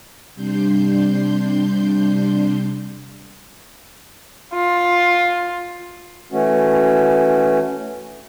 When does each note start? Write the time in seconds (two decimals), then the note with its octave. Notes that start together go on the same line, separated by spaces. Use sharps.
0.35 C3 G3 D4 C6 G6
4.53 F4
6.32 E3 A3 C#4 F#4